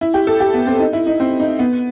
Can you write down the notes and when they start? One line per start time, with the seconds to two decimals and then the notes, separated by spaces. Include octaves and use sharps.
0.01 E4
0.14 G4
0.27 A4
0.40 G4
0.54 B3
0.67 C4
0.80 D#4
0.93 E4
1.07 D#4
1.20 C4
1.40 D#4
1.59 B3